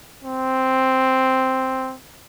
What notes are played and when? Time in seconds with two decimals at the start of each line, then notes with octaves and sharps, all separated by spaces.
0.23 C4